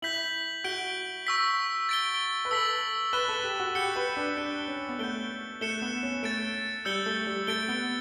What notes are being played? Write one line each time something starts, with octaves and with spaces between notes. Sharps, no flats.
E4 G6 B6 F#7
F#4 G6 D7 G7
C#6 E6 B6
A6 D7 G7
B4
A4 E6 B6 F#7
B4 F#6 A6 E7 G7
A4
G4
F#4
G4 G6 C#7 E7 G7
B4
D4
D4 G6 D7 G7
C#4
B3
A3 G6 D7 G7
A3 F#6 C#7 E7 G7
B3
C#4
A3 A6 D7 G7
G3 E6 G6 C#7 G7
A3
G3
A3 A6 D7 G7
B3